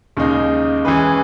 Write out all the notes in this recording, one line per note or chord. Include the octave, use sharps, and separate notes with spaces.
D#2 C#3 G#3 D#4
E3 G#3 C#4 G#4 B4